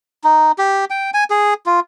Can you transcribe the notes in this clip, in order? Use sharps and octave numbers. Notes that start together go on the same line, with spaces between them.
D#4
G4
G5
G#5
G#4
F4